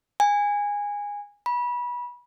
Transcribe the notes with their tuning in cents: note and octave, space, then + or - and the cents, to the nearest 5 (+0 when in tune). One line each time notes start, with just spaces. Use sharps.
G#5 -15
B5 -25